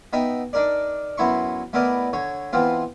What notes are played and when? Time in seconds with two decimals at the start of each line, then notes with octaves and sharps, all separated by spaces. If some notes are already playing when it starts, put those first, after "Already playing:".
0.13 B3 D#4 D#5 E5 G5
0.53 D4 D#4 A#4 D5
1.18 F#2 B3 E4 C6 C#6
1.73 A3 B3 E4 A#4 D5 D#5
2.13 D3 C#5
2.53 E3 B3 C4 F4